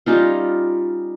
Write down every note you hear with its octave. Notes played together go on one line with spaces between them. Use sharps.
G3 C#4 D#4 F4